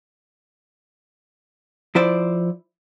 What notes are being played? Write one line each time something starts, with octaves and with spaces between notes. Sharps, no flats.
F3 E4 C5 D5